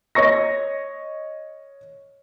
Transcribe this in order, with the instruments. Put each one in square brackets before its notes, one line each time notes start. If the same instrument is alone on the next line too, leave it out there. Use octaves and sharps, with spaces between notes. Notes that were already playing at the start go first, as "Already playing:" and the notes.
[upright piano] C#5 D#5 C#6 A#6